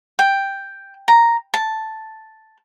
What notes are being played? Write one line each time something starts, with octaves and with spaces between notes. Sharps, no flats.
G5
A#5
A5